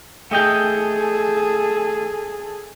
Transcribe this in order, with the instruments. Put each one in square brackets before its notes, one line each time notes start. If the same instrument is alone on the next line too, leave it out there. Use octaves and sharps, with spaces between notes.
[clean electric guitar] A3 D#5 G5 [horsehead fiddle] G#4 A4